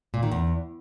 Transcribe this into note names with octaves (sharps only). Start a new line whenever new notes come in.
A#2
D#3
E2